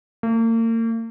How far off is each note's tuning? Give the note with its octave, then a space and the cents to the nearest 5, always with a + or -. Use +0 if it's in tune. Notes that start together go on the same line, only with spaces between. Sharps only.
A#3 -40